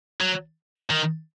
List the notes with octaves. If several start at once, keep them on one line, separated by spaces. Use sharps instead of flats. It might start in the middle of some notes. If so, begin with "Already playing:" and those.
F#3
D#3